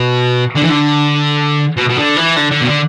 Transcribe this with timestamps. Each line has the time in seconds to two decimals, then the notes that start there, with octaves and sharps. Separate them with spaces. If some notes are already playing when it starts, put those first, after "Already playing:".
Already playing: B2
0.56 D3
0.63 E3
0.69 D3
1.77 B2
1.89 B2
1.97 D3
2.16 E3
2.36 D3
2.51 D3
2.62 B2
2.66 D3